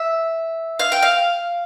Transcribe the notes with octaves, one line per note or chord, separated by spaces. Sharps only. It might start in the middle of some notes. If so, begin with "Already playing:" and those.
Already playing: E5
F5
G5
F5